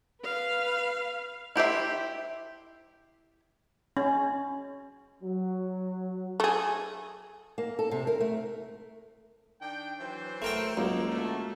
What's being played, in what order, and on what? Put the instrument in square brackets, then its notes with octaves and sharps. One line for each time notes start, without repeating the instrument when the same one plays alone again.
[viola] B4 F5
[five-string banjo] E4 G4 C5 E5
[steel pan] C#4
[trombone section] F#3
[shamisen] A3 G#4
[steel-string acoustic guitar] A#3
A4
C3
A#4
A3
[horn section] D#3 D4 G5
E3 F#3 C5
[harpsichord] A3 A#4 G5
[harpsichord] C#2 [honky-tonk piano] F#3 A#3
[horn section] D3 A3